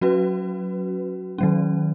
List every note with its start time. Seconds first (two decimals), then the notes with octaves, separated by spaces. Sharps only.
0.01 F#3 C#4 F#4 B4
1.38 D#3 F#3 C#4